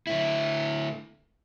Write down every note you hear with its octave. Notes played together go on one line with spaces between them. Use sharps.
D3 A3 E4